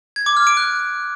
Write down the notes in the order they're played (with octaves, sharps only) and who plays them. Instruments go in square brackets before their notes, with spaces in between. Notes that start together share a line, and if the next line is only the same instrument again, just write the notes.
[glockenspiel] G#6
D6
F6
D7
F#6